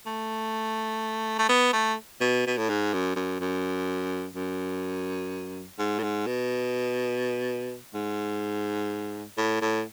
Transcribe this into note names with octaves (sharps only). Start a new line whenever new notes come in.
A3
A3
B3
A3
B2
B2
A2
G#2
F#2
F#2
F#2
F#2
G#2
A2
G#2
B2
G#2
A2
A2